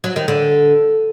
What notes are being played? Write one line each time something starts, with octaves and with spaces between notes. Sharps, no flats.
F#3
D#3
D3